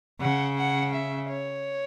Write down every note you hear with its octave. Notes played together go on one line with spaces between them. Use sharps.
C#3 F#5
F#5
E5
C#5